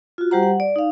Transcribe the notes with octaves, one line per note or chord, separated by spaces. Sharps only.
F4 F#4
G3 G4 C5 F#5 A#5
F#5
D5
D#4 F5